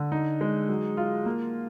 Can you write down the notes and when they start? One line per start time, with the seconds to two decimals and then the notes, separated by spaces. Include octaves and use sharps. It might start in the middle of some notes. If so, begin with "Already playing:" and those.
Already playing: D3
0.12 D#4
0.41 G#3
0.69 F#3
0.97 F4
1.26 A#3